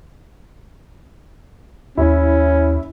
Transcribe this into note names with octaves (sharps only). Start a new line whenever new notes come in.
D#2 C#4 E4